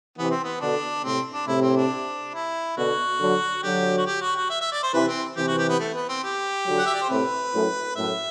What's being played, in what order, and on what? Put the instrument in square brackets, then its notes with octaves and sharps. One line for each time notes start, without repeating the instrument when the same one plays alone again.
[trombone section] C3 E3 [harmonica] B3
[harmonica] C4
B3
[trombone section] B2 D3 [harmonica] D4
[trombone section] A2 C3 [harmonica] C4
[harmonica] D4
[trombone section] A2 C3 [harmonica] E4
[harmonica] C4
D4
E4
[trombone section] B2 D3 [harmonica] F#4
[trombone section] D3 F#3
[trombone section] D3 F#3 [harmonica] G4
[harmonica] F#4
G4
F#4
F#4
E5
E5
D5
C5
[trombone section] C3 E3 [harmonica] B4
[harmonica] C4
[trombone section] C3 E3 [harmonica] G4
[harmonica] F#4
G4
B3
A3
B3
C4
G4
[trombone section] D3 F#3
[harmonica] F#5
E5
D5
C5
[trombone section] A2 C3 [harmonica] B4
[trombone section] F#2 A2
[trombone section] F#2 A2 [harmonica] E5